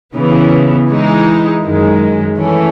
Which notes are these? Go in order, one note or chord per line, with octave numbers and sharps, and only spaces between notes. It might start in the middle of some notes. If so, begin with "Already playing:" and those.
C#3 E3 B3
E3 G#3 D#4
F#2 D#3 G#3
E3 A3 C#4